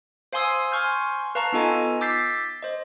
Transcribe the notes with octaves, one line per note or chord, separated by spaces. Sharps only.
C5 F5 G#5 C6 D#6 E6
G#5 C6 C#6 F6 G6
B4 F5 A5 A#5 C#6
B3 D#4 F4 A4 D#5 G#5
D6 E6 G6 A6 B6 C7
C5 D#5